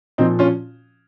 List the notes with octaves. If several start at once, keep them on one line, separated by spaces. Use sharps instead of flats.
A#2 F3 C4 D#4
C#4 F4